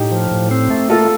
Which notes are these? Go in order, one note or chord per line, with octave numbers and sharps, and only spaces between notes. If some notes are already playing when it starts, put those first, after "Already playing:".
Already playing: A2 D#4 G4
F3
A2
C4
A3
A#3 F4 A4